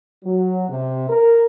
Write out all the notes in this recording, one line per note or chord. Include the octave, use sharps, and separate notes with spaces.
F#3
C3
A#4